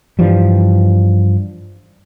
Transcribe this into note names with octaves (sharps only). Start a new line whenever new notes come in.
G2 E3 F3 G3